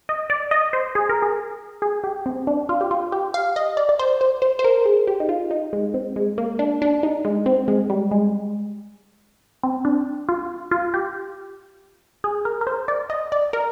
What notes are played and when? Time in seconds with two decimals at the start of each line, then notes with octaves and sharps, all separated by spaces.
0.09 D#5
0.30 D5
0.51 D#5
0.73 C5
0.95 G#4
1.09 A#4
1.22 G#4
1.82 G#4
2.04 G4
2.26 C4
2.47 D4
2.69 F4
2.81 G4
2.91 F4
3.12 G4
3.34 F5
3.56 D#5
3.77 D5
3.89 D5
3.99 C5
4.21 C5
4.42 C5
4.59 C5
4.64 A#4
4.85 G#4
5.07 G4
5.20 D#4
5.29 F4
5.51 D#4
5.73 G#3
5.94 C4
6.16 G#3
6.38 A#3
6.59 D4
6.82 D4
7.03 D#4
7.25 G#3
7.46 C4
7.68 G#3
7.90 G3
8.11 G#3
9.63 C4
9.85 D4
10.29 F4
10.71 F4
10.94 G4
12.24 G#4
12.45 A#4
12.61 A#4
12.67 C5
12.88 D5
13.10 D#5
13.32 D5
13.53 A#4